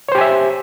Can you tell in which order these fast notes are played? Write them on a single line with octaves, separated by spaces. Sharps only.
C#5 C5 G4 G#5 E5